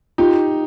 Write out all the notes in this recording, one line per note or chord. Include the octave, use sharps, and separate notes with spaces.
D#4 F4 G4